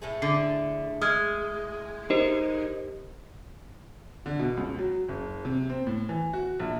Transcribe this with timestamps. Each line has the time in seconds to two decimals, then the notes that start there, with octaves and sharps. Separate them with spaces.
0.02 A2 A3 G#4
0.22 D3 C7
1.02 G#3 D#6 F6 G#6
2.10 D#4 G4 A#4 C5
4.26 D3
4.39 B2
4.57 C#2
4.79 F#3
5.08 F#1
5.45 C3
5.70 C4
5.87 A2
6.09 E3
6.33 F#4
6.60 A#1